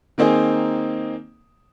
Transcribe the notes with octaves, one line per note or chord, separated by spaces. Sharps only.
D#3 A#3 C4 D#4 G#4